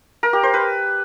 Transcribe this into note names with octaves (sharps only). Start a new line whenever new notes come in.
A#4
G4
C5
B4